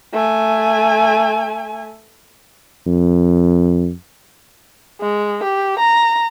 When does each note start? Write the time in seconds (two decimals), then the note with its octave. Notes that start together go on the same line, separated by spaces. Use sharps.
0.13 A3 G#5
2.87 F2
5.01 G#3
5.44 G4
5.79 A#5